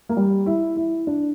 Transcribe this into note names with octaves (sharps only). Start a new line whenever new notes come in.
A#3
G3
E4
E4
D4